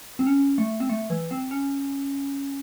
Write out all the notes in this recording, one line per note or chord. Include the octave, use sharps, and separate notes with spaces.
C4
C#4
A3
C4
A3
E3
C4
C#4